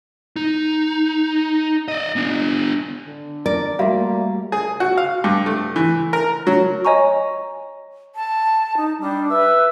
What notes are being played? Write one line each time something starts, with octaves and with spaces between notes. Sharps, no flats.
D#4
D5 D#5
B3 D4
D3
A#4 D5
G3 A3 A#3 F#4 E5 F5
G#4
F#4
F5
G2
A3
E3
A#4
F#3
C#5 D#5 G#5 A#5 C#6
A5
D#4
G3 D4
B4 E5